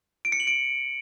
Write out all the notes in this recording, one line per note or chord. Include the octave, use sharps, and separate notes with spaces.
D7
C#7
F#7
D7